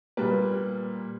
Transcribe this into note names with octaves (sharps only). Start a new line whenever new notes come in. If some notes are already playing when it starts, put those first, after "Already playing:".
A#2 G3 A#3 B4